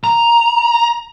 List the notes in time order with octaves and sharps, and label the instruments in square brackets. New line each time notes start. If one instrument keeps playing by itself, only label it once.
[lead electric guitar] A#5